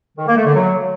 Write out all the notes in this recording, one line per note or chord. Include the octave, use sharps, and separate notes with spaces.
D#3
A#3
A3
D3
F#3